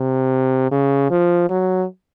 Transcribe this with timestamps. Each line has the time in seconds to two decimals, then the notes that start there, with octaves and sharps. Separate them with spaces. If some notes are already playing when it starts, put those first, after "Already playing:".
Already playing: C3
0.72 C#3
1.10 F3
1.50 F#3